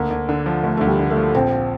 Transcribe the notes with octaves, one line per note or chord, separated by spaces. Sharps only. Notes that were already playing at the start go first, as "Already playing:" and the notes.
Already playing: D2 A#3
D2
D3
F3
D2 A3
D2 A3
G3
D3
A3
F3
A#1 C4